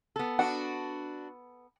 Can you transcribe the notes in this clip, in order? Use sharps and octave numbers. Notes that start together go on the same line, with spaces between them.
B3 A4
D4 F#4 F#5